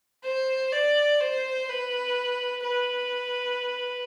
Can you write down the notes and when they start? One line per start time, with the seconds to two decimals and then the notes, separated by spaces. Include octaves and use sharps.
0.24 C5
0.72 D5
1.21 C5
1.69 B4
2.65 B4